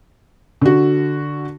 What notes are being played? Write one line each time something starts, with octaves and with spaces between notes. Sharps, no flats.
D3 F#4